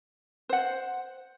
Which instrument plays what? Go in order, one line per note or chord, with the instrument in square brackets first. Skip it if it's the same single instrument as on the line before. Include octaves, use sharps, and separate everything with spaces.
[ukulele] C5 F#5